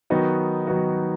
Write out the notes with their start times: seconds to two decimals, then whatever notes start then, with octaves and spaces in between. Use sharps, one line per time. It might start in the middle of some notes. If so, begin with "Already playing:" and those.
0.10 D#3 F#3 B3 D#4 F#4
0.67 D#3 F#3 B3 D#4 F#4